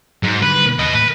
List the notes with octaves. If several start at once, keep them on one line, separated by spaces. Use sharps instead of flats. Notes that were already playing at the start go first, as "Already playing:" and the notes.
G#2 F#3
D3 G3 B4
B2 D#3 A#3
D#2 B4 D#5
A2 B4